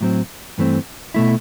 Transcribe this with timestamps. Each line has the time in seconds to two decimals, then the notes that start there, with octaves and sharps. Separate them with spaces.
0.01 A2 F#3 C4
0.58 G2 E3 A3 C4
1.14 B2 A3 E4